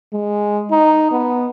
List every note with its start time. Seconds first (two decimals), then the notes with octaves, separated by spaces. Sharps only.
0.13 G#3
0.71 D#4
1.11 B3